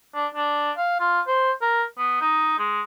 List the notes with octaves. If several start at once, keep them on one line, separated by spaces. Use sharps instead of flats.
D4
D4
F5
F4
C5
A#4
B3
D#4
G#3